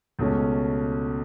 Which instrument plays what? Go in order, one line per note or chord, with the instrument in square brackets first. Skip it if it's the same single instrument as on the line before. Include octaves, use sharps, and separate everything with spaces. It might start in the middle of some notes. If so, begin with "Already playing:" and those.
[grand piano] C#2 B2 A3 C#4